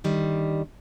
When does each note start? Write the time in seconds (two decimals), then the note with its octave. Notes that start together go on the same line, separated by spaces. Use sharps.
0.04 D3 D#3 G3